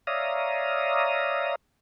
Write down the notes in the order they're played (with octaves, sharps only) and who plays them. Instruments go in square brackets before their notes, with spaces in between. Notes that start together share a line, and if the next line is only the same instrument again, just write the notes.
[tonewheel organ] C#5 D5 E5 F5 A#5 D#6